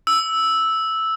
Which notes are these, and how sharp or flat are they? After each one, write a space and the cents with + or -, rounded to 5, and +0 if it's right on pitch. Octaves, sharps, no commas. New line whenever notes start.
E6 -5